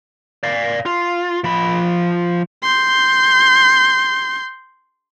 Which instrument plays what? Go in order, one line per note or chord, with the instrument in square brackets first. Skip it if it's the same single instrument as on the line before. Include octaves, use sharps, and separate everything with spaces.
[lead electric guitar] D5 F5
F4
F3 B5
[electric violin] C6 G6